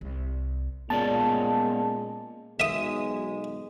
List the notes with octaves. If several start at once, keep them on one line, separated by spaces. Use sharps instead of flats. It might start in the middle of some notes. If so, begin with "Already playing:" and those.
C2
A#2 G#3 B3 C#4 D5 A5
B1 G#3 E5 D#6